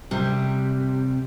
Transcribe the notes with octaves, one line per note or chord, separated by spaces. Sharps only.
C3 G3